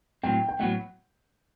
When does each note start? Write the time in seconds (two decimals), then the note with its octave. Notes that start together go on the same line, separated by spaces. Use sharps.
0.23 A2 F#3 C4 G5
0.48 G5
0.59 A2 F#3 B3 F#4 F#5